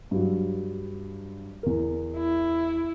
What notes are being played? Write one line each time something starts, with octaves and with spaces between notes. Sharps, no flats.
G2 F#3
E2 A#4
E4